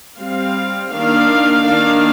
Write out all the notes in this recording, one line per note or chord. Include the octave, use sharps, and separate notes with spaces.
G3 C4 F5
D#3 A#3 D4 F5
D#3 A#3 D4 F5